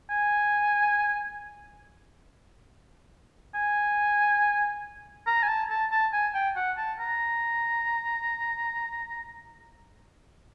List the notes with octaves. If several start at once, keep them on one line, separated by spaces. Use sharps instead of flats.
G#5
G#5
A#5
G#5
A5
A5
A5
G#5
G5
F#5
A5
A#5